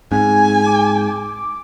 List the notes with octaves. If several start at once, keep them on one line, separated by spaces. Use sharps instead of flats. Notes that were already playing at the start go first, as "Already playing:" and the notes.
G#2 C4 G#5
D6